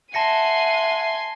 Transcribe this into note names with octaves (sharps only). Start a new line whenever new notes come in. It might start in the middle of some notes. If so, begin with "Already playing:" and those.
E5 F#5 G#5 A5 C6 A#6 C#7 D#7